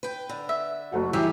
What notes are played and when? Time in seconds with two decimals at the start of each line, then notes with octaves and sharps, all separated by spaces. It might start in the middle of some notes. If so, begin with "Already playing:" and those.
0.03 B4 G5
0.29 D3
0.49 E5
0.92 F#1 A3 F#4 F#5
1.13 E3 G3 B3 E4 G4 G#4 E5 D6